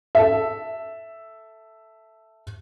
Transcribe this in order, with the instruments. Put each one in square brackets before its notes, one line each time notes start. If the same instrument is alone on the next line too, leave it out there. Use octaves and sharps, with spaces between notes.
[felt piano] A4 E5